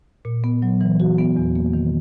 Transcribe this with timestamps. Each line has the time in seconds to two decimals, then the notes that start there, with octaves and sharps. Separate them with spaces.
0.25 A#2
0.44 B3
0.62 F#3
0.81 E3
1.00 F#4
1.18 B3
1.36 E2
1.56 A#3
1.73 D#3